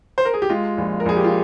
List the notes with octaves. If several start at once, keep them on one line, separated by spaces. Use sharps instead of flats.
C5
A#4
G#4
G4
G#3 F4
A#1
A#4
A#1 G#4
G4
F4